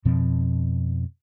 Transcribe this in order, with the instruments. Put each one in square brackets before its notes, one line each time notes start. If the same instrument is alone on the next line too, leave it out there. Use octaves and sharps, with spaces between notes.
[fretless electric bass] F2 B2 F3 C4